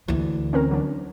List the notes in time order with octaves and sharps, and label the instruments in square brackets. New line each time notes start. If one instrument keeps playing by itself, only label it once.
[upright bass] D2 E3
[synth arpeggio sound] C4 C#4 A#4
F#3 D4